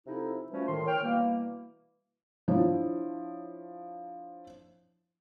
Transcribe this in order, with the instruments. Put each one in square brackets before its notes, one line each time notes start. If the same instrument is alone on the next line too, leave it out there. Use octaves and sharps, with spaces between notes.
[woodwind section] C3 F3 D#4 E4 A4
E3 F3 G3 A3 C#4 F#4
A2 D#3 C6
C#5 G5 F6
B2 E3 G3 A#3
[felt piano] F3 D4 E4 C#5